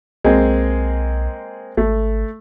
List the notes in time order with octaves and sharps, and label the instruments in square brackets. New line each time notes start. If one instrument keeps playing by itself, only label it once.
[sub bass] B1 [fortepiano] G#3 A#3 C4
[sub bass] G#1 [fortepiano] A3